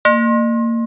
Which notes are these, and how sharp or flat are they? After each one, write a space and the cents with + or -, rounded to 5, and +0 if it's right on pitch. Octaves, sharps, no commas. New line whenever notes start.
A#3 -25